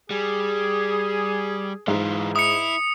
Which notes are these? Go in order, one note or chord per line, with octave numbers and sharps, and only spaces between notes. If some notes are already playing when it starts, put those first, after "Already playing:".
G3 G#4
G#2 E3 F4
E4 D#6 C#7